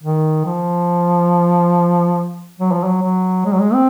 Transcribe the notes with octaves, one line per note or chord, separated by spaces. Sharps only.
D#3
F3
F#3
F3
F#3
F#3
G#3
F#3
G#3
C4